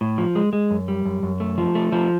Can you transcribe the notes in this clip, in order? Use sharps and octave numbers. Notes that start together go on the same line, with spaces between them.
A2
F3
G#3
G#3
F#2
G3
F#2
F#2
A3
F3
A3
F3